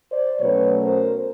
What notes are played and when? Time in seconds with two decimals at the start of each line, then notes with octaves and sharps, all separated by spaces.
0.11 C5 D5
0.40 B2 F#3 A3 C#4 B4 C#5
0.83 A#4 C5